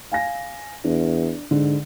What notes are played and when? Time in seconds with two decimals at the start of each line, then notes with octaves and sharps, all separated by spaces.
0.12 F5 G#5 A#6
0.84 E2 D4
1.51 G#2 D3